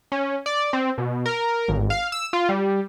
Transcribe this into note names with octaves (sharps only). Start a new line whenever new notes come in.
C#4
D5
C4
B2
A#4
G#1
F5
E6
F4
G3